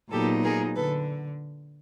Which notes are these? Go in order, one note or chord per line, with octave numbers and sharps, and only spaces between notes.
A#2 F#3 B3 D#4 G4 A4
G#4 A#4
D3 A4 B4